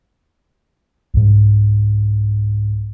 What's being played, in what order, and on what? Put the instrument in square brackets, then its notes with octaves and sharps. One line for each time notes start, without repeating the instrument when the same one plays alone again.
[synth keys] C2 G#2